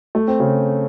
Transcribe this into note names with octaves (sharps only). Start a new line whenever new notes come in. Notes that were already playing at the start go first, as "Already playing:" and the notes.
A3
C4
C#3